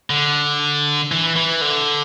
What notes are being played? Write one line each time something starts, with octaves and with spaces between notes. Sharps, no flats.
D3
E3
E3
D3